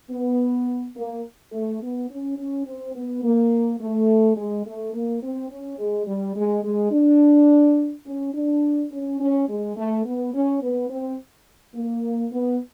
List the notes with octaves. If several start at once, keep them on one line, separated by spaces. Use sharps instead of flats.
B3
A#3
A3
B3
C#4
C#4
C4
B3
A#3
A3
G#3
A3
A#3
C4
C#4
G#3
G3
G#3
G#3
D4
C#4
D4
C#4
C#4
G#3
A3
B3
C#4
B3
C4
A#3
B3